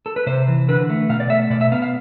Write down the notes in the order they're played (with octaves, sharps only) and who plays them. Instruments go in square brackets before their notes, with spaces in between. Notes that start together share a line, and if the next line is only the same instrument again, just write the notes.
[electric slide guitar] A4
B4
C3 C5
E3
D3 B4
A3
B2 F5
D5
A3 E5
B2 D5
E5
B3 F5
F5